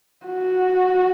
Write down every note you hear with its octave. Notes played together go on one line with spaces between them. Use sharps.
F#4